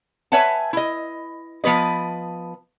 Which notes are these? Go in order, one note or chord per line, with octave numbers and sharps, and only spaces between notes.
B4 C#5 E5 F#5 G#5 A5
E4 D#5
F3 B3 B4 D#5